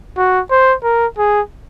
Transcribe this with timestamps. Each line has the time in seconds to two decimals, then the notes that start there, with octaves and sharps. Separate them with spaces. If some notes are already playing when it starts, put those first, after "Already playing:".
0.17 F#4
0.51 C5
0.83 A#4
1.18 G#4